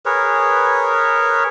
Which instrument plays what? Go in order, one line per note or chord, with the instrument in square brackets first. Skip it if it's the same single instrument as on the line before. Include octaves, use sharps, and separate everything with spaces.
[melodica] G#4 A#4 B4 C#5